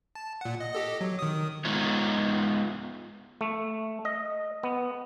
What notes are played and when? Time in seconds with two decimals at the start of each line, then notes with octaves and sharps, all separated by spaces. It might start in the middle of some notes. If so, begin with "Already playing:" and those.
0.15 A5
0.41 A#2 F#5
0.60 D#5
0.73 G4 A4 D#5
1.01 F#3
1.19 D#3 D#6
1.65 G#3 B3 D#4 F4 C#5
3.41 A3
4.05 D#5
4.63 B3